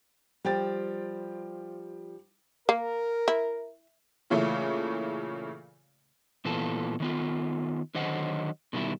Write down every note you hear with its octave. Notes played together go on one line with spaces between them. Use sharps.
F3 G3 G5 A6
A#3 A#4
E4
A#2 C#3 E3 A3
A#2 E3 B3 F4 A4
D#3 B3 F4
D3 D#3 F#3 C5 D#5 F#5
B2 D#3 G3 E4